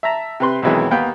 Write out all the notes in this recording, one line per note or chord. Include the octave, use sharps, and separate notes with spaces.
E5 A5 A#5
C3 B4 C6
B1 F2 D#3 E3 F#3 G#3
D#2 B3 F5 G5